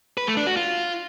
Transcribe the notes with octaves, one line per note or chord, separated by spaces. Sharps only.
B4
A3
D4
F#4
F4